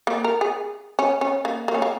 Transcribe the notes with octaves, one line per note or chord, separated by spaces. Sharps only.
A#3
A#4
G#4
C#4
C#4
A#3
A#3
C#4
A#3